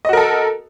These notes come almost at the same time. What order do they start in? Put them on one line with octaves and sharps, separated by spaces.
D#5 F#4 A#4 A4